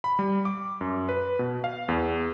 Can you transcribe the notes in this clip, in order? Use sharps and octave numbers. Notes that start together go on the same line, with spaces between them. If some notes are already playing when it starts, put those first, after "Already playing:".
B5
G3
D6
F#2
B4
B2
F5
E2